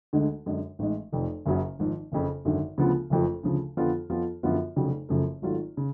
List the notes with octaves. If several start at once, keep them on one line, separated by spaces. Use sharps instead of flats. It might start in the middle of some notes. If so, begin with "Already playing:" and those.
D2 D3 G#3
F#2 D3 G#3 D4
A1 G#2 G#3
F1 F2 F3
F#1 F#2 C#3 F#3
G#1 G#2 F3
F#1 F2 C#3
G#1 F#2 D3
D2 C#3 F3 B3 F4
F#1 F2 F3 A3 F4
D2 C#3 F3
F2 D3 F3 B3 F4
F2 F3 B3 F4
F#2 D3 F3 B3 F4
F1 F2 C#3 F#3
F#1 F#2 C#3 F3 A3
G#1 G#2 F#3 A3 F4
C#3